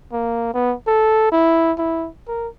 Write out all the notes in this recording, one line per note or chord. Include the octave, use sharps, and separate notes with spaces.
A#3
B3
A4
E4
E4
A#4